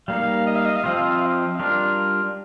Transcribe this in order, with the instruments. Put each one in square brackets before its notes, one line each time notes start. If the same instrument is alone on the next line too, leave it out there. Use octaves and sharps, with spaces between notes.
[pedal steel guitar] G3 A#3 D#4 [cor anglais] F5
[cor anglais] D#5
F5
D#5
F5
[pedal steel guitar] F3 C4 F4 [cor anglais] D#5
[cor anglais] F5
D#5
F5
D#5
F5
D#5
[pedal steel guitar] G3 D4 F4 A#4 [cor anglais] F5